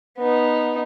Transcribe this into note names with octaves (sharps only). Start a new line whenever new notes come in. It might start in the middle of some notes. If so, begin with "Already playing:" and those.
B3 D#4